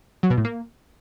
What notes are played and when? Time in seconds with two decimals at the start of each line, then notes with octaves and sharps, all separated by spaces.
0.23 F#3
0.30 B2
0.37 A2
0.45 A#3